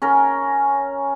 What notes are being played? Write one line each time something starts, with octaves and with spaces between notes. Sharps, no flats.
C#4 A#4